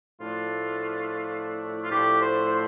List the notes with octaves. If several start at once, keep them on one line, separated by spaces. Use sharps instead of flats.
A2 F3 A3 D4 F4
F4
A2 F3 A3 D4 G4
C5
C5